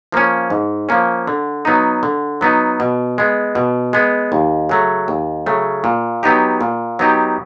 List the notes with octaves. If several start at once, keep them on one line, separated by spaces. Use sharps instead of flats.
F3 A#3 C#4
G#2
F3 A#3 C#4
D3
F#3 B3 D#4
D3
F#3 B3 D#4
B2
G#3 B3
B2
G#3 B3
D#2
C#3 F#3 A3
D#2
C#3 F#3 A3
A#2
F#3 B3 D#4 G4
A#2
F#3 B3 D#4 G4